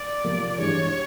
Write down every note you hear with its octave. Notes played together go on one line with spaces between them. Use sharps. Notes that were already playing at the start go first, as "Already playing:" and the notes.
Already playing: D5
C3 F3 A#3
G2 E3 G#3 C#5